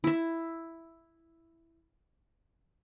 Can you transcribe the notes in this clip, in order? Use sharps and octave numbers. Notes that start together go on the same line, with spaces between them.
E4 E5